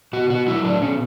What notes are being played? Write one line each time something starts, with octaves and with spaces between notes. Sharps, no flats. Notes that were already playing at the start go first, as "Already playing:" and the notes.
B2 F#4
F#4
F#3 A3 E4
D4
B2 C#4